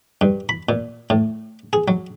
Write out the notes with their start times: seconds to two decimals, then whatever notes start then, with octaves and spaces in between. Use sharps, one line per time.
0.21 G2
0.49 B5
0.69 A#2
1.10 A2
1.73 G#4
1.88 F#3